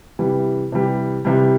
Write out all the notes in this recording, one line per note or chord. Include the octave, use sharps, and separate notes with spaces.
C3 E3 G3
C3 E3 G3
C3 E3 G3